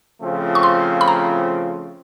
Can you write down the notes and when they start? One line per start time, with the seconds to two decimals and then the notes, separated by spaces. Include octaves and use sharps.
0.20 C#3 F3 A3 C4 F4
0.55 C#6
0.63 C6
1.01 B5
1.08 A#5